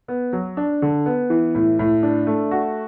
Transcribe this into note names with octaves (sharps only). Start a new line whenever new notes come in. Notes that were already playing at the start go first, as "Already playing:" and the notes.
B3
F#3
D4
D3
B3
E3
A2
A2
D4
A3
F#4